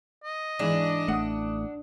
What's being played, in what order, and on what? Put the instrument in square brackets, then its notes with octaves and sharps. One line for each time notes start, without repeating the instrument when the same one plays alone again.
[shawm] D#5
[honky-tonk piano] G#2 E3 [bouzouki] D4
[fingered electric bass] A1 A3 [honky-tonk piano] F#5 D#6